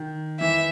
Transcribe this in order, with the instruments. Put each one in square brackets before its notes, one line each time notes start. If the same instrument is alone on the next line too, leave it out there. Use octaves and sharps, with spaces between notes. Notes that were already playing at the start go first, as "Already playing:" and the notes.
Already playing: [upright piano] D#3
[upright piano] E3 [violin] E5